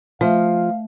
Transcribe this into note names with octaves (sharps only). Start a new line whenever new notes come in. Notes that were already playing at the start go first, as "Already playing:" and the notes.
F3 A3 E5 F5